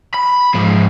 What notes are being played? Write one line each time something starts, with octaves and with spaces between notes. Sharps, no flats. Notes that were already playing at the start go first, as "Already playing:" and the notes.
B5
G#2 F3